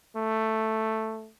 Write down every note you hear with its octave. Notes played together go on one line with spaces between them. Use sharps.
A3